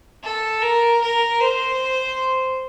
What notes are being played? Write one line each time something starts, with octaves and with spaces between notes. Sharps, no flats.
A4
A#4
A#4
C5